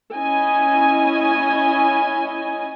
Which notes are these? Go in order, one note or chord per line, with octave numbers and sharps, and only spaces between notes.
C#4 E4 D#5 G#5